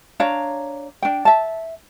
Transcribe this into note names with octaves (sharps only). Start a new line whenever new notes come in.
D4 C#5 F5 A#5
D4 G5
E5 A5